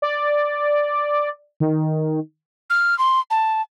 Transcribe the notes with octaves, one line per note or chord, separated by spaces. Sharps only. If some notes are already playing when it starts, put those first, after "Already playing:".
D5
D#3
F6
C6
A5